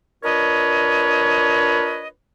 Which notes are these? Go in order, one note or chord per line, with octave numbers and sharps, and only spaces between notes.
D4 F4 A#4 B4 C#5 D#5